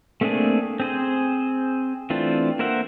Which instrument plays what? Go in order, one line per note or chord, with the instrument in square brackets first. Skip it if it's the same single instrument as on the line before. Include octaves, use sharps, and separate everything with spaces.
[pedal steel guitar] A3 A#3 C4 D4 G#4
C4 G#4 C5
E3 A3 C4 D4 F4
A#3 A#4 C5 E5 F#5